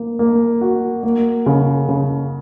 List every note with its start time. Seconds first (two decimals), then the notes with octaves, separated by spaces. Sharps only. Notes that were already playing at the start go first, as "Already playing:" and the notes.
Already playing: A#3
0.19 A#3
0.61 F#4
1.03 A#3
1.46 C#3
1.89 C#3